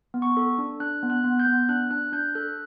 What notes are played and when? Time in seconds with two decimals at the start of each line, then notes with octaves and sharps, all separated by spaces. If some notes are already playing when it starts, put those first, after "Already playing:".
0.14 B3
0.22 C#6
0.37 A4
0.58 D4
0.80 D4 F#6
1.03 B3
1.10 F#6
1.24 B3
1.40 G6
1.47 B3
1.69 D4 F#6
1.91 D4 F#6
2.13 D4 G6
2.35 A4 F#6